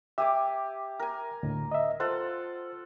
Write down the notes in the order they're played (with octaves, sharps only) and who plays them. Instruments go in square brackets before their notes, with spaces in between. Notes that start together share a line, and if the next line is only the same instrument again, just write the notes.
[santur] G4 G#5 D6 [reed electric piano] E5
[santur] A#4 G#5
[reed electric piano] D2 A2
D#5 E5
[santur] F4 A4 F#5 [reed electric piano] C5